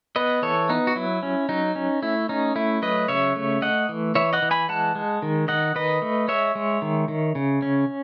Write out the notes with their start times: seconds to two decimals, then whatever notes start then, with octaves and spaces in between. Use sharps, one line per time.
0.16 B3 B4 D#5
0.42 E3 A4 C#5
0.69 B3 D#4
0.87 F#4
0.96 F#3 E4
1.23 C#4
1.49 F#3 D#4
1.76 C#4
2.02 A3 E4
2.29 C#4 D#4
2.56 A3 E4
2.82 F#3 B4 D#5
3.08 C#3 C#5 E5
3.36 A3
3.62 A3 D#5 F#5
3.89 E3
4.15 E3 C#5 E5
4.33 D#5 F#5
4.42 E3
4.51 G#5 B5
4.69 G#3 F#5 A5
4.95 G#3
5.22 D#3
5.48 D#3 D#5 F#5
5.75 D#3 B4 D#5
6.02 A3
6.28 G#3 C#5 E5
6.55 G#3
6.82 D#3
7.08 D#3
7.35 C#3
7.62 C#4